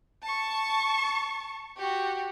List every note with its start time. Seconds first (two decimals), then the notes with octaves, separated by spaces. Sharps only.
0.23 A5 C#6
1.77 F#4 G4